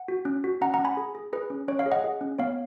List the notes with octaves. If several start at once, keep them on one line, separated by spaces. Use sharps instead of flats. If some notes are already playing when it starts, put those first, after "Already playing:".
Already playing: F#5
F#4
C#4
F#4
C#4 F#5 A#5
F#5 A#5
C#4
G#5 B5
G#4
G#4
G#4 B4
C#4
C#4 C#5
C#5 F5
G#4
D#5 F#5
G#4
C#4
B3 C#5 F5